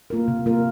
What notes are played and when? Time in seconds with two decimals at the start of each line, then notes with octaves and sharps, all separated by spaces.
0.10 A#3 F4 A#4
0.28 C3
0.46 A#3 F4 A#4